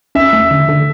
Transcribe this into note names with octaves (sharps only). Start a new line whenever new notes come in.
C#4 E5
A3
D3
D3